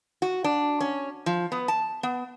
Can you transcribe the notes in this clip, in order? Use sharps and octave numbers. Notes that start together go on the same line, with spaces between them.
F#4
D4
C#4
F3
B3
A5
B3